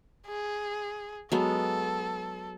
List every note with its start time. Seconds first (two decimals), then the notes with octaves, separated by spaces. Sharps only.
0.27 G#4
1.32 F#3 G#3 B3 A4